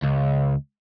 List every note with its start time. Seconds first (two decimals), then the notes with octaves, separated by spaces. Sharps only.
0.02 C#2